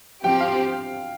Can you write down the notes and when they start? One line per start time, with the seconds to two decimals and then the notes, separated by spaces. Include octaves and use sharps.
0.24 F3 C4 G4 G5
0.41 F5